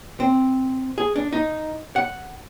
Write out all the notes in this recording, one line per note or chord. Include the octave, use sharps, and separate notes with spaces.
C4
G#4
D4
D#4
F#5